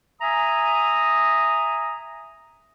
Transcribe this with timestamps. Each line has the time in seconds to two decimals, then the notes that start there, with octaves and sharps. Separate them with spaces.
0.21 E5 G#5 A#5 D#6